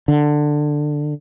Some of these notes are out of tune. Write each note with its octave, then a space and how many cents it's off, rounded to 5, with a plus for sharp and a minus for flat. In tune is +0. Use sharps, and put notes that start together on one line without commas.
D3 +15